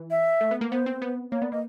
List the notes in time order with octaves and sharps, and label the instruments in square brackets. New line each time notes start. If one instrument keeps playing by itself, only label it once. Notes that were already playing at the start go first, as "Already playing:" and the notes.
Already playing: [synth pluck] E3
[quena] E5
[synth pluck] A3
B3
A#3
[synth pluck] B3 [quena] C5
[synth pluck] C4
B3
[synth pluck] A#3 [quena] C#5
[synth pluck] B3 [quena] D5
[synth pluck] A#3 [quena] D#5